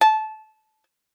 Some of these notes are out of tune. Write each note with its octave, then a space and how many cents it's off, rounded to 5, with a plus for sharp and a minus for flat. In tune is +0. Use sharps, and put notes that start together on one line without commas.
A5 -20